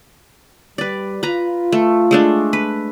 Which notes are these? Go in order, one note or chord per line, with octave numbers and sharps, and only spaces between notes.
G3 B4 D5
F4 B4 A#5
A3
G#3 A3 D4
B4